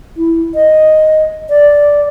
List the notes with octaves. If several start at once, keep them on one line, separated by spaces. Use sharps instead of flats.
E4
D#5
D5